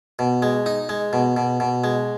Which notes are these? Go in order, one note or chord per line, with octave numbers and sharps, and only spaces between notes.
B2
G#3
D#4
G#3
B2
B2
B2
G#3